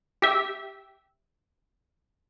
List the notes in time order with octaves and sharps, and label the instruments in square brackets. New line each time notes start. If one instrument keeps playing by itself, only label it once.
[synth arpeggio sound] G4 E5